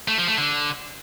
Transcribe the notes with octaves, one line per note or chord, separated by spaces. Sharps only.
A3
F3
A3
D3